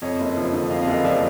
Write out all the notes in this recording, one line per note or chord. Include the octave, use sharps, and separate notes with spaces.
F2 C#5 D#5
F#1
F3
D3
F2 D#5 F5
D#5 F5
F#1
D#5 F5
F3 D5 E5